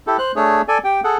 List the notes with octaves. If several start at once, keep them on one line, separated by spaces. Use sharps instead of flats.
E4 G4 A4
C5 F#6
A3 D4 G#4 C#5
A4 D5 G#5
G4 G5
G#4 A4 F#5